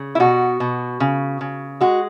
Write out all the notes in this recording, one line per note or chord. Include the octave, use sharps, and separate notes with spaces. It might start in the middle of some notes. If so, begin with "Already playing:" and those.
Already playing: C#3
E4
B2 F#4
B2
C#3
C#3
G#3 F#4